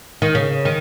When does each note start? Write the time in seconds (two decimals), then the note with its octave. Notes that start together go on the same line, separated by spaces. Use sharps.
0.22 D#3
0.35 C#3
0.65 D#3